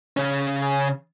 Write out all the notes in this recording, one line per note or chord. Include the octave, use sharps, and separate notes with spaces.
C#3 C#4